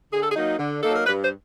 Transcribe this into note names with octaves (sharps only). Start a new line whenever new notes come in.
D3 G#4
A4
G#4
F#3 A#3 D#4
D3
F#3 A#3 D#4 A4
A#4
G2 B4
C5